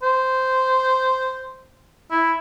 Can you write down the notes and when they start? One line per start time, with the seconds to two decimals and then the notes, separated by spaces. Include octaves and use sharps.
0.02 C5
2.10 E4